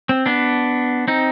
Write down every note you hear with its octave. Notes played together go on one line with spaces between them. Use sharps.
C4
B3 D4
C4 D#4